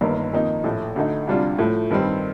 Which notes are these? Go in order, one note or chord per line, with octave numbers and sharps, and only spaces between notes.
G1 G2 D#3 A#3
F2 D#3 A#3 D#4
A#1 A2 A3
D2 D3 A3 D#4
D2 C3 G3 D4 F4
A2 F3 A3
G2 D#3 G3 C4